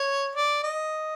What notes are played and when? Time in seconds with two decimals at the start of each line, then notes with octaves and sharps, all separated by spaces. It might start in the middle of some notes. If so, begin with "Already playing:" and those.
Already playing: C#5
0.36 D5
0.63 D#5